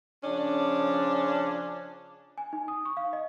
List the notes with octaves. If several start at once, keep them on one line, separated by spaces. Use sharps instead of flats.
C#3 F3 C#4 D4
G#5
D#4
D#6
C#6
F5
D#5